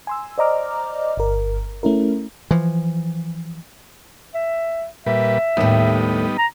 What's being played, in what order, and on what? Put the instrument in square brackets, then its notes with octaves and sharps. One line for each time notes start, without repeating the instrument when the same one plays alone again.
[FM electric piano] G#5 C6 E6
C5 D5 D#5 A#5 D6 F6
G1 A#4
A3 C#4 E4 A#4
[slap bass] E3 F3
[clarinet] E5
[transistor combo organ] A#2 G3 B4 [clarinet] E5
[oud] D#2 A2 [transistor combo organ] G3 B3 D#4
[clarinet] A#5